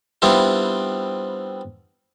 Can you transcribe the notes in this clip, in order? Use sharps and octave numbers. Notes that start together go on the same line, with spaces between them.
G3 B3 C4 D4 E4 F4